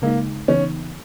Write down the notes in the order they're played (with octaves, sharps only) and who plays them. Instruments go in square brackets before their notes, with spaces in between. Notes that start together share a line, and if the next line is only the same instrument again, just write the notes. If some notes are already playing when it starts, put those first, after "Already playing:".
[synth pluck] C#3 G#3 D#4 [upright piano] A#3
[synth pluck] C#3 E3 B3 D#4 [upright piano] C#4